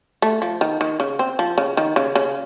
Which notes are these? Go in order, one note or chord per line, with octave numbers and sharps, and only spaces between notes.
A3
F3
D#3
D#3
C#3
C4
F3
C#3
D#3
C#3
C#3